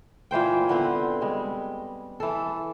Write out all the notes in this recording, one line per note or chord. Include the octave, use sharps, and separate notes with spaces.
A#2 E3 C5 G5
D3 B3 C4
G3 G#3
E3 A4